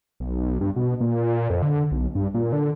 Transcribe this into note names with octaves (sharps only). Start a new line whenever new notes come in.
B1
G2
B2
A#2
F2
D3
B1
G2
A#2
D3